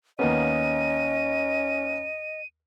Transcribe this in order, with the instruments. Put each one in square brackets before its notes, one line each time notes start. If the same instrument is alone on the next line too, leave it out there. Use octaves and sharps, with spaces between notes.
[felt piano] D#2 A#3 B3 [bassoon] C#4 [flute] D#5 [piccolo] D#7